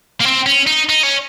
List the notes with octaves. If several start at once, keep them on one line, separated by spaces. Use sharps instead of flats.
A#3
C4
C#4
D#4
D#4
C#4